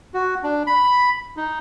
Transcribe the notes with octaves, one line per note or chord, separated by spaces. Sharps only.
F#4
D4
B5
D#4